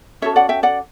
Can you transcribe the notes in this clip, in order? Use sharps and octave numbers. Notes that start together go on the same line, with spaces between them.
C#4 F#4 A4 C#5 E5
D5 F#5
E5 G5
D5 F#5